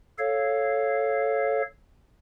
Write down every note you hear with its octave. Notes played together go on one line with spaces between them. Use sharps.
A4 C#5 F5